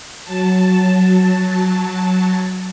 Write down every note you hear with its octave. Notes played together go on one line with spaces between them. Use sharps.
F#3 A5